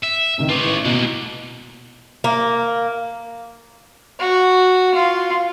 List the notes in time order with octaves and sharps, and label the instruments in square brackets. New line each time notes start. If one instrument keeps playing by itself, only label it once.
[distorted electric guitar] E5
[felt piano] A2 C3 D#3
[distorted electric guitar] F4 C#5 [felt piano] B4 D6 D7
[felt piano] A1
[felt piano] B2 [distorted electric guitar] D3 A#3
[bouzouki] A#3
[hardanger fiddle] F#4
F4